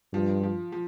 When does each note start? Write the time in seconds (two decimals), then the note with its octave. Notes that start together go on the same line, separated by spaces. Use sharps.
0.13 G2 F3
0.43 F3
0.72 F3